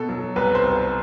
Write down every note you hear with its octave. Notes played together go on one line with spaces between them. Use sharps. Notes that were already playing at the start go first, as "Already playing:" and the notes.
Already playing: B2 A4
F#3
C2 B4
C5
C2
C5